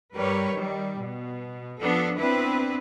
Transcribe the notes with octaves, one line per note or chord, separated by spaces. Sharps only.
G2 G3 G4 A#4 B4 C#5
D#3 G3
B2
F3 B3 D4 A4
B3 C4 D4 E4 B4